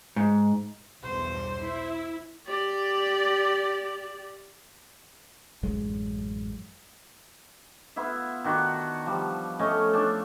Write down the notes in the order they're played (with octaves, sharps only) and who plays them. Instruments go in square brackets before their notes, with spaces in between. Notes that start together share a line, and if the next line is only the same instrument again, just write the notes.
[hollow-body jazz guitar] G#2
[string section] B1 E2 G2 [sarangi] C5
[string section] E4
[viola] G4 D5
[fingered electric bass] A1 F#2 F#3 G#3
[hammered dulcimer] B3 E4 F4 E5
D#3 D4 F#4
F3 G3
A3 C#4 C#5 D#5
D4 A4 A5